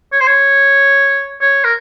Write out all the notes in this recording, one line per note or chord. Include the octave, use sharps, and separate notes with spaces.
C#5
C5
C#5
C#5
A#4